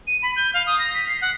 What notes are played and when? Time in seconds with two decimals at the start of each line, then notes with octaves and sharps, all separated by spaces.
0.07 D#7
0.23 B5
0.36 G6
0.54 F5
0.67 D#6
0.79 A#6
0.94 B6
1.08 C7
1.22 F#5